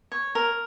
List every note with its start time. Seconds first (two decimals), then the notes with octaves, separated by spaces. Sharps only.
0.12 C#5
0.35 A#4